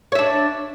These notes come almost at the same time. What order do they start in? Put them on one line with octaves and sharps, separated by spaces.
C#5 E5 D4